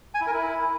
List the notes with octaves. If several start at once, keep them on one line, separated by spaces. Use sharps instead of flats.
G#5
E4
A#4
E4